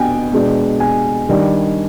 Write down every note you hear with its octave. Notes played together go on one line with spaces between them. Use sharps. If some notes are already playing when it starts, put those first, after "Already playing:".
Already playing: B2 D4 G5 G#5
B2 G#3 D4
G#5
D#3 G3 D4